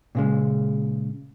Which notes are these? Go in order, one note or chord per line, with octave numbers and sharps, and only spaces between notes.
A#2 C#3 G#3